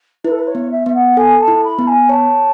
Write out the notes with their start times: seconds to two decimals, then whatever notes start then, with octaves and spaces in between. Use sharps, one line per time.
0.24 E4 B4
0.31 A4
0.38 B4
0.47 C#5
0.55 B3
0.71 E5
0.86 B3 E5
0.94 F#5
1.17 A4 G#5
1.40 A5
1.48 E4
1.64 B5
1.79 B3
1.87 G#5
2.09 C#5 A5